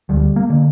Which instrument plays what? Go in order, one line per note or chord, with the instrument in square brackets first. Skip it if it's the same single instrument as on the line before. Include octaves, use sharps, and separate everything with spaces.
[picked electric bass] D2 G3
A#3
D3